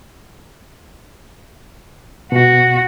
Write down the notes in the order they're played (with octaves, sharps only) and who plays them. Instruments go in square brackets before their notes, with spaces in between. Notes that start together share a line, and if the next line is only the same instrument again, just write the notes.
[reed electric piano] B2 [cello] F#4